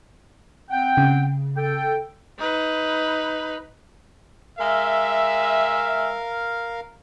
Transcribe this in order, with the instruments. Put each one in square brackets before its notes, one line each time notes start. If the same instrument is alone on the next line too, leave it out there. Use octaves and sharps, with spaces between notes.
[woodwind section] C4 F#5 G5
[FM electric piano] C#3
[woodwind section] A4 G5
[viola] D#4 B4
[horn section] G#3 E5 [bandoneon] A#4 F5